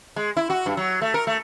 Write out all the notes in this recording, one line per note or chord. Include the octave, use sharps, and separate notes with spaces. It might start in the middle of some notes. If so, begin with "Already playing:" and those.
G#3
E4
F#4
G2
F#3
A3
A#4
A3